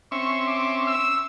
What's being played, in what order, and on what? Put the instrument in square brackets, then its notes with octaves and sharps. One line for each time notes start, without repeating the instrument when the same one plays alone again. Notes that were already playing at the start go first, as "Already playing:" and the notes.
[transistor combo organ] C4 C#4 E5 [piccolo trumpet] C#6
[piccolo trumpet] D6
E6